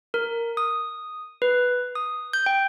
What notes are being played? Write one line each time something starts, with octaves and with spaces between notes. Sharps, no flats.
A#4
D#6
B4
D#6
G6
G5